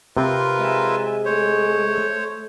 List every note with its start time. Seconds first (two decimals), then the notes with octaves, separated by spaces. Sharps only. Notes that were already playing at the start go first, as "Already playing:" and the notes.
0.17 C3 C4 F4 A#4 B4
0.60 G#3 E5 G#5
1.25 A3 C5 C#5